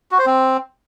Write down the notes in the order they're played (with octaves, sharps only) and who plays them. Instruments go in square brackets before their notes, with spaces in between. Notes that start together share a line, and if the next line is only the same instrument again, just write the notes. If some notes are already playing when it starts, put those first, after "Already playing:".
[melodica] F#4
C5
C4